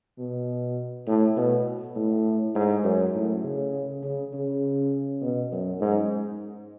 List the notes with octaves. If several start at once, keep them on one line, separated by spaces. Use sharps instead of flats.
B2
A2
B2
A2
G#2
F#2
A2
C#3
C#3
C#3
B2
F#2
G#2